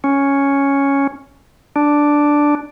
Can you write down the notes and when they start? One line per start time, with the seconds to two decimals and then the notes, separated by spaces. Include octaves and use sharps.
0.04 C#4
1.76 D4